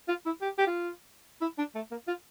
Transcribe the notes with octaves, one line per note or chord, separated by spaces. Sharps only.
F4
E4
G4
G4
F4
E4
D4
A3
A#3
F4